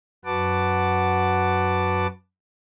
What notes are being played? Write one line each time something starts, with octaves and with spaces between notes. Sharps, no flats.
F#2 F#4 B4 F#5 A5 D6